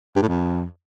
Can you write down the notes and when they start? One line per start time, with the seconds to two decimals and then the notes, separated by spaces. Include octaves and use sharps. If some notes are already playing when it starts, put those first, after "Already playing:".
0.16 G2
0.22 A2
0.28 F2